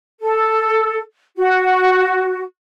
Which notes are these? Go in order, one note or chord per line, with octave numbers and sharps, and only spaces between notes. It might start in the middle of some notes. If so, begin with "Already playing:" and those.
A4
F#4